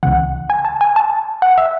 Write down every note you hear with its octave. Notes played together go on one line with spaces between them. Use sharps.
C#2 C#3 E3 F#5
G#5
A5
G#5
A5
F#5
E5